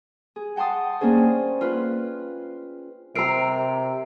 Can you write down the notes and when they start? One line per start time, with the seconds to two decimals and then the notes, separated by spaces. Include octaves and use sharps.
0.36 G#4
0.56 F#5 G5 A5 C6 D#6
1.01 A#3 C#4 D4 G#4 C5
1.61 F4 B4
3.16 C3 A#4 A#5 E6 C7 D7